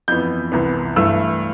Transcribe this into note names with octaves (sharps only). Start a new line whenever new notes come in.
F2 E3 B3 G6
C2 C3 E3 B3
G2 E3 A3 E6